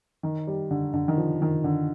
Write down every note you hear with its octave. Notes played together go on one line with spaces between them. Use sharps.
D#3
G3
D3
D3
D#3
F3
D#3
D3